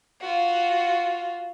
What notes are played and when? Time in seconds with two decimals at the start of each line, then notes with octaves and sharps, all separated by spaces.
0.21 F4 F#4